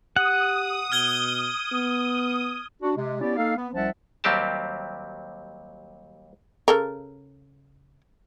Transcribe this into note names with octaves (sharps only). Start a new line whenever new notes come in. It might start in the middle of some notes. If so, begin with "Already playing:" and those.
G4 F#5 D#6
B2 F6 G#6 G7
B3
D4 F#4
C3 G#3
B3 C#4 E4 G4 D5
A#3 D#4 A4 F5
B3
C2 F3 C#4 E5 F#5 A5
D#2 F#3 G3 C4 G4 A5
C#3 A4 A#4